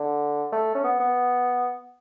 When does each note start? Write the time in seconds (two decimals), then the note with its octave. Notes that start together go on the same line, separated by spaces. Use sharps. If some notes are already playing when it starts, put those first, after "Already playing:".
Already playing: D3
0.52 A3
0.75 C#4
0.84 B3
1.00 B3